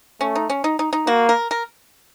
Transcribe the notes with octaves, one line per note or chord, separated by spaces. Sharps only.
A3 C#4
D#4
C#4
D#4
D#4
D#4
A#3 F#4
A#4
A#4